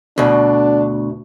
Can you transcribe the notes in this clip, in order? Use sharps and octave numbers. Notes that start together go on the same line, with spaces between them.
D2 B2 D4